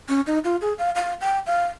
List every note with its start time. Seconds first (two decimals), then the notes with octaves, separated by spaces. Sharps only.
0.09 C#4
0.27 D#4
0.44 F4
0.61 G#4
0.79 F5
0.96 F5
1.21 G5
1.46 F5